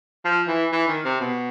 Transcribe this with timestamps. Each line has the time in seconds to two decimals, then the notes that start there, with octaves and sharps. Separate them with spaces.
0.25 F3
0.48 E3
0.73 E3
0.88 D#3
1.05 C3
1.20 B2